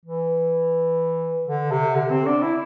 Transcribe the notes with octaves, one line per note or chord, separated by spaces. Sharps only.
E3
D3
C3
D3
C4
D4
E4